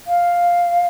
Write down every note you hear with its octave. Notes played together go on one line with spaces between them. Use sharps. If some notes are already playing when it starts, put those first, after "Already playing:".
F5